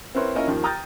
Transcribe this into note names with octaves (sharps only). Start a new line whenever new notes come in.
C4 E4 A#4 B4 C#5 C6
A#3 C#4 E4 F4 A#4 D#5
D#2 D#3 F3
G5 A#5 D#6 F6 G6 A6